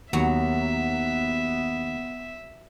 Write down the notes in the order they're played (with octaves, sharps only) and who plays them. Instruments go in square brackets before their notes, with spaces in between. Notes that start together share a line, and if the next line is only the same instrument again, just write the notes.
[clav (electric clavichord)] D#2 [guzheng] F#3 [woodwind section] B3 [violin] E5